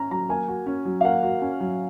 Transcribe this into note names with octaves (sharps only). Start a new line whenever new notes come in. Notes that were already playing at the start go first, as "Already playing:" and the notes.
Already playing: C#4 A#5
F#3 A#5
A#3 G#5
F#4
C#4
F#3
F5
A#3 F#5
F#4
C#4
F#3